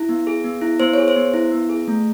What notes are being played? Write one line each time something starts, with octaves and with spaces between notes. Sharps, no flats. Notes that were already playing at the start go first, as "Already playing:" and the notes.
Already playing: E4
B3
G#4
B3
E4
B3 C5
G#4 C#5
C5
B3
E4
B3
G#4
A3